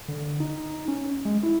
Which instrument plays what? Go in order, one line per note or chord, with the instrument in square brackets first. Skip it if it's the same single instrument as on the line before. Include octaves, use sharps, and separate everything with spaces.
[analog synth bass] D3
D#4
C#4
G#3
E4